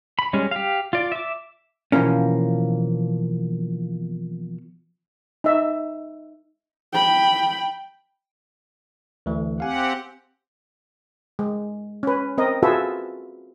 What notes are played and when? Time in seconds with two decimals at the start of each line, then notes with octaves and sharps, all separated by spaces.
0.19 B5
0.33 G3 G#3 C#4
0.51 G4 F5
0.93 F4 D5
1.12 E5 D6
1.92 B2 E3 F3 A#3 C#4
5.44 D#4 E5
6.93 G5 B5
9.26 D2 E3 A3
9.60 C4 G4 F5 F#5 G#5
11.39 G#3
12.03 C#4 B4
12.38 C4 A#4 D#5
12.63 F4 F#4 G#4 A4 B4 E5